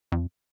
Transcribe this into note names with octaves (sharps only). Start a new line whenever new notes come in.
F2